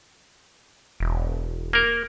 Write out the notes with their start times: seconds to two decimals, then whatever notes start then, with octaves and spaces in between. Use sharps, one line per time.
1.00 E1
1.73 A#3 A#4